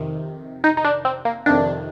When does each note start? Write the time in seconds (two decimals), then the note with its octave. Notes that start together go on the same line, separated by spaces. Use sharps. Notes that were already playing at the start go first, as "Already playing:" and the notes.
Already playing: F2 C3 D#3
0.64 D#4
0.77 D#4
0.85 D4
1.05 C4
1.25 A#3
1.46 F2 C3 D#3 D4